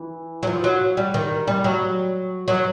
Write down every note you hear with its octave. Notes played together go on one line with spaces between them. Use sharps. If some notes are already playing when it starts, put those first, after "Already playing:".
Already playing: E3
F#3
F3
F#3
G3
D#3
G3
F#3
F#3